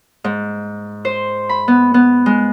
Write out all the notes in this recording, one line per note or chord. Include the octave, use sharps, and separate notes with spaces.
G#2
C5
B5
B3
B3
G#3